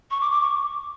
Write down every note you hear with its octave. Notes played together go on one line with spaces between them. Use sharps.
C#6
D6
D6
C#6